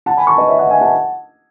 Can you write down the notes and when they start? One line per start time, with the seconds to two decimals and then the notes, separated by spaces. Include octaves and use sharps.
0.06 F#5 A5
0.17 G#5 B5
0.27 A5 C#6
0.38 B4 D#5
0.48 C#5 E5
0.59 D#5 F#5
0.70 E5 G#5
0.81 F#5 A5